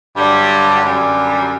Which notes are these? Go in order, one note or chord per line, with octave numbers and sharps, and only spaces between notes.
G2 D3 F#3 G3
F#2 D3 G3